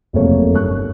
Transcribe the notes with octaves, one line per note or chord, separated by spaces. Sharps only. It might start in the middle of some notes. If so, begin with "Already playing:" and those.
F#1 F2 C3 A3 A#3 C#5
G1 C#6 F#6